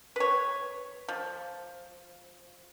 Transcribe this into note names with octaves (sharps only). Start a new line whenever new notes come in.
B4 C#5
F3